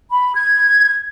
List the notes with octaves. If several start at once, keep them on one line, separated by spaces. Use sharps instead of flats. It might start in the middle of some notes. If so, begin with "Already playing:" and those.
B5
G#6